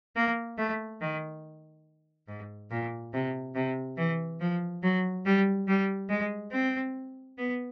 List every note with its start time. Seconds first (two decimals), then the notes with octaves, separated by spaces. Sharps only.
0.16 A#3
0.58 A3
1.02 D#3
2.28 G#2
2.71 A#2
3.14 C3
3.55 C3
3.97 E3
4.40 F3
4.83 F#3
5.26 G3
5.68 G3
6.10 G#3
6.52 C4
7.38 B3